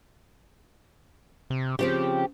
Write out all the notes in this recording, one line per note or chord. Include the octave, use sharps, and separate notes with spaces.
C3
C#3 F3 C4 G4